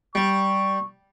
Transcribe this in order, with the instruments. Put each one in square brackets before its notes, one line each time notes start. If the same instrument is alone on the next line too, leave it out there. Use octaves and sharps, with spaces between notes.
[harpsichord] G3 [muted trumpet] C#6